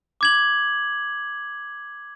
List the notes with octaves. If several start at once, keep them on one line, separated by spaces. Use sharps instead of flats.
D6 G#6 F#7